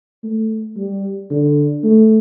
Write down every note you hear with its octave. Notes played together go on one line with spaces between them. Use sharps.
A3
G3
D3
A3